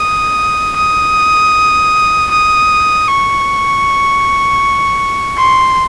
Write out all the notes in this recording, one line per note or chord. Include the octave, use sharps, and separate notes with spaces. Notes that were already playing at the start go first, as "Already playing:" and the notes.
Already playing: D#6
D#6
D#6
C#6
C6